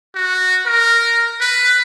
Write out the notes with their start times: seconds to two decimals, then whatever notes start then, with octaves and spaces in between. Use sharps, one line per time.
0.15 F#4
0.66 A#4
1.41 B4